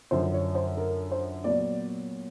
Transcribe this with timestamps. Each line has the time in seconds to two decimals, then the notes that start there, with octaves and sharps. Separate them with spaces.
0.11 F#2 D3 F3 C5
0.34 C#5
0.55 C5
0.77 A#4
1.12 C5
1.44 A#2 F#3 B3 D5